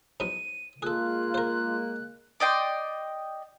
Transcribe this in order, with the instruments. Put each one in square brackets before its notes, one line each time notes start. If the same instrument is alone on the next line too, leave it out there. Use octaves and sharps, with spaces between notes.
[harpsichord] G#2 F#3 B3 [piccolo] D#7
[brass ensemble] G#3 A#3 [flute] F4 [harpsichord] G#4 A4 [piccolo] F#6
[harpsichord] A#4 C5
[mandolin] D5 D#5 G5 C6